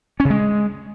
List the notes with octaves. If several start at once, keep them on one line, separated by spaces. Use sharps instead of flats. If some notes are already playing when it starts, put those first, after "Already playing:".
C#4
C#3
G#3